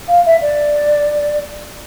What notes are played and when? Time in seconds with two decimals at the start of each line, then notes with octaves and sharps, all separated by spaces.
0.10 F5
0.25 E5
0.41 D5